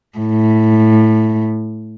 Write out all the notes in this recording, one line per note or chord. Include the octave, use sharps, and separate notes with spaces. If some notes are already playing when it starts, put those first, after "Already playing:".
A2